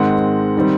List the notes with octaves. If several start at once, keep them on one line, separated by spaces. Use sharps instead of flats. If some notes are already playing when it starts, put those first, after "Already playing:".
Already playing: G#2 D#3 G#3 C4 F#5
D#3 G3 C4